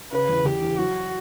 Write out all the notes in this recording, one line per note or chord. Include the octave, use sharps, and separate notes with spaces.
C#3 B4
E2
E2 G4
E3
F#3 F#4